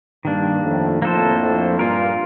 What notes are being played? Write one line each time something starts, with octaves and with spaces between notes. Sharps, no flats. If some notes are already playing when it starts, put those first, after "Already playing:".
G2 D#3 A#3 D4
F2 A2
F2 A2 A#3 D4 A4 C5
G2 A#2 A#3 F4 A#4